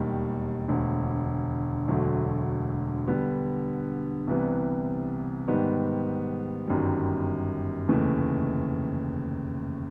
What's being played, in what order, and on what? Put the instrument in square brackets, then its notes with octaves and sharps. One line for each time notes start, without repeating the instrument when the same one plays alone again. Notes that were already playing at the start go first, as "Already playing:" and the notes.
Already playing: [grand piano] E1 D#2 D#3 G3
E1 D2 D3
E1 D2 D3 F#3 A3
D3 G3 B3
C2 C3 E3 G3 B3
G#2 D#3 G3 B3
G1 F#2 D#3 G3
F1 D#2 C#3 E3 A3